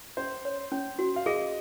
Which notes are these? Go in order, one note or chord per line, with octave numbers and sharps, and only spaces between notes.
C#4 C5
C#5
C#4
F#4
F5
G#4 D#5